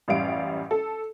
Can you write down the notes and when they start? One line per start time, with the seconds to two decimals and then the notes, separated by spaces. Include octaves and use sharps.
0.08 A1 F#2 G3 F5 D7
0.71 A4